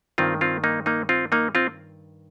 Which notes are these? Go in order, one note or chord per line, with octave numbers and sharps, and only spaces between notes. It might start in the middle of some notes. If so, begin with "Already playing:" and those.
G2 D#3 C4 F4
C4 F4
A#3 D#4
A#3 D#4
C4 F4
A#3 D#4
C4 F4